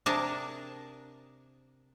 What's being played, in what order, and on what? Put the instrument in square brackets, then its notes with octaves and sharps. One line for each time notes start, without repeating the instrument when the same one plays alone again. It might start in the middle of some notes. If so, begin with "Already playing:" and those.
[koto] C3 D4 G#4 A#4 A5